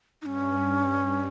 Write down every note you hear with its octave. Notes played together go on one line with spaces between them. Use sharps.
G2 C#4 D#4